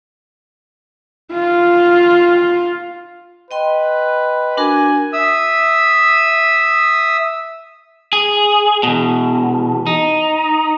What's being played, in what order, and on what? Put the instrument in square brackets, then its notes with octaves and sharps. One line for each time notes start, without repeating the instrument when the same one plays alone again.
[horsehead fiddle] F4
[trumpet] B4 [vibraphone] D#5 G5 C6
[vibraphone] D4 F#4 A#4 [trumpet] G#5
[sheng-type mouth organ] E5 D#6 E6
[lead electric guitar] G#4
E2 B2
D#4